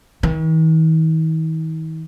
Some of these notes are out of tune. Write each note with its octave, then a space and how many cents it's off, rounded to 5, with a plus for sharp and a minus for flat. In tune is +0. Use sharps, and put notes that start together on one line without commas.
D#3 +45